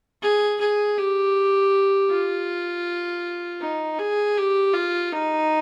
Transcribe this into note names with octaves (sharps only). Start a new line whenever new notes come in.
G#4
G#4
G4
F4
D#4
G#4
G4
F4
D#4